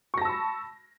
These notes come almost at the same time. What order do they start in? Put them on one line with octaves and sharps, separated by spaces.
C#6 A#6 A5 E6 B5